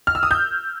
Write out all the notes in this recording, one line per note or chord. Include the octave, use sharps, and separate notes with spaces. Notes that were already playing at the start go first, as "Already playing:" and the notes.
F6
E6
D#6
G6